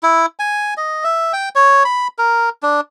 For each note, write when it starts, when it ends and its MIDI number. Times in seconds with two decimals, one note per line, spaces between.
0.03 0.26 64
0.39 0.74 80
0.77 1.04 75
1.04 1.33 76
1.33 1.49 79
1.55 1.83 73
1.85 2.08 83
2.18 2.49 70
2.63 2.81 62